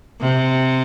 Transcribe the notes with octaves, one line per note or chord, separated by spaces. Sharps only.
C3